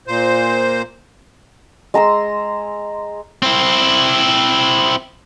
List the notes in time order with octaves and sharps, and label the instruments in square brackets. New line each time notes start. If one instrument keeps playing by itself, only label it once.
[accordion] A#2 C5
[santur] G#3 A#5 C6 E6
[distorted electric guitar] C4 E4